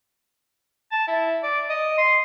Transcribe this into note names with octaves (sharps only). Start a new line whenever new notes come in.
A5
E4
D5
D#5
C6